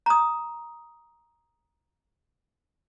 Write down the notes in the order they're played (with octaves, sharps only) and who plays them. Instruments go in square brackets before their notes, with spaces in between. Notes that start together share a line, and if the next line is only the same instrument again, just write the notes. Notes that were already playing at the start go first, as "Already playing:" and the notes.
[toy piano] A#5 D#6